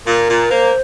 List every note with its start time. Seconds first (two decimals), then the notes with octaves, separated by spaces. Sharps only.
0.06 A#2 A#4
0.28 A#2
0.51 A#3 C5